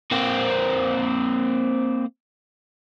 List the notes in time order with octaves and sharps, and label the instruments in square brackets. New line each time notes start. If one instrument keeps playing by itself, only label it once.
[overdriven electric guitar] A#3 C4